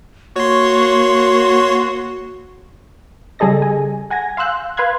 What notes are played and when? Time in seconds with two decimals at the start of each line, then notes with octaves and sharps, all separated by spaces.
0.36 A#3 F#4 C#5 C6
3.39 C#3 G3 G#4 A4 D#5 A#6
3.62 G#5
4.10 F#5 G#5 G#6 A#6
4.37 F5 C6 E6 F#6 G6
4.77 B4 F5 B5 C6 F#6 G#6